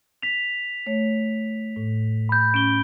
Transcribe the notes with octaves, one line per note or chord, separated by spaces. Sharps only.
B6 F7
A3 C#5
A2
B5 G6
C#4 D7 G7